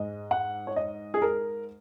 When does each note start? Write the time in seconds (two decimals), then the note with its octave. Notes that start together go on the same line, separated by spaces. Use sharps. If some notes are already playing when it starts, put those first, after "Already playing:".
Already playing: G#2 G#3 D#5
0.31 F#5
0.67 C#5
0.76 D#5
1.14 G#4
1.22 A#4